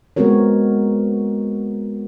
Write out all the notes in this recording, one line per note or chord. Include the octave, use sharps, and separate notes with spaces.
G#3 B3 C4 F#4 A#4 C#5